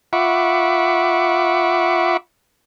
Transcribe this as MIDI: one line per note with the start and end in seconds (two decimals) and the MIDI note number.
0.13 2.17 65
0.13 2.17 76
0.13 2.17 78
0.13 2.17 83
0.13 2.17 85
0.13 2.17 86